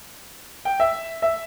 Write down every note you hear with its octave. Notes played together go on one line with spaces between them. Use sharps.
G5
E5
E5